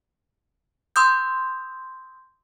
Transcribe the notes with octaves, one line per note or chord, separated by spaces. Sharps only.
C6 D#6 E6 G6